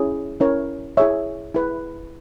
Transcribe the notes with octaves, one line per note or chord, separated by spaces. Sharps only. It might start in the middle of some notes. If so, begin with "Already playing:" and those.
Already playing: C#4 E4 G#4 C#5
C#4 E4 A#4 C#5
E4 G#4 C#5 E5
E4 G#4 B4